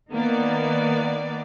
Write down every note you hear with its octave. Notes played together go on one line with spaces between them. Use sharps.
D#3 A#3 B3 D5